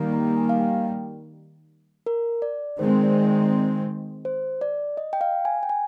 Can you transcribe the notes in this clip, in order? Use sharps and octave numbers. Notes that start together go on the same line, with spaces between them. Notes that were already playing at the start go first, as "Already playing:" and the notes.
Already playing: D#3 G3 A#3
A#5
G#5
F5
G5
A#4
D5
D#3 G#3 C4 C5
D5
D5
C5
D5
D#5
G5
F5
G#5
G5
G#5